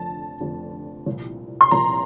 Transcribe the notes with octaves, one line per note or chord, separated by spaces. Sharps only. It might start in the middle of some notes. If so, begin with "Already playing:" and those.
Already playing: F1 F2 D3 F3 A5
F1 F2 D3 F3
C2 A#2 F3
C6
C2 A#2 F3 A#5